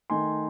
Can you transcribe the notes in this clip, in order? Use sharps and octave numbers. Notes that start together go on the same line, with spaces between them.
D#3 A3 D#4 G#5 C6